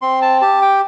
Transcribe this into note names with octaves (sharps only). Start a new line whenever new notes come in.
C4 C6
A5
G4 A5
G5